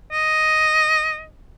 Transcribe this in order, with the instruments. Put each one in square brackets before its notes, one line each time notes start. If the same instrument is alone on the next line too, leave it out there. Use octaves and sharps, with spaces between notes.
[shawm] D#5